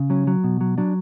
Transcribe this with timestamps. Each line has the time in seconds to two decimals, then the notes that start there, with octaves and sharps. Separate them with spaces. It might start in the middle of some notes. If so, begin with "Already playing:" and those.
Already playing: C#3
0.10 F#3 C#4
0.27 F#3
0.44 B2
0.61 F#3
0.78 F#3 D4